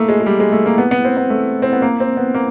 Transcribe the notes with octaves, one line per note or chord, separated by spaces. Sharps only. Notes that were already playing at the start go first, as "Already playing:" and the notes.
Already playing: A3 A#3
G#3
G#3
G3
G#3
A3
A#3
B3
B3
C4
B3
A3
C4
B3
A#3
C4
B3
A#3